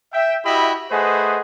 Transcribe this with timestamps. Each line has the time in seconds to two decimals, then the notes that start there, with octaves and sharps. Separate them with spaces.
0.13 E5 G5
0.45 E4 F#4 G4 D#5 E5 B5
0.91 A3 G#4 B4 C5 D#5 F#5